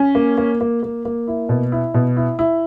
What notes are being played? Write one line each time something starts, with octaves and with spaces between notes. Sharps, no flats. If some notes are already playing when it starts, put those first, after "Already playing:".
Already playing: C#4
A#3
A#3
A#3
A#3
A#3
E4
B2
E4
B2
E4
E4